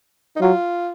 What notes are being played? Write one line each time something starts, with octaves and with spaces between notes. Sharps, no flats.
D#4
F#3 F4